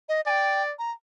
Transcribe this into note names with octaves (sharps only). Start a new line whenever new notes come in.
D#5
D5 G5 G#5
A#5